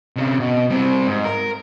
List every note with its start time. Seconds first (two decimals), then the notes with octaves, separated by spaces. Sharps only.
0.16 C3 C#4
0.40 B2
0.70 G3 C4
1.07 G#2
1.25 A#4